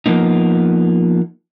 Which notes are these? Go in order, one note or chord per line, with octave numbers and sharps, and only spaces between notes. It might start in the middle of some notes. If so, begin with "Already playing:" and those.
F3 A#3 B3 D#4